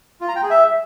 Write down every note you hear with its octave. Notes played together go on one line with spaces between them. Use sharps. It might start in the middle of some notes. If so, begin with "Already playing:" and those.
F4
A#5
G5
G#4
E5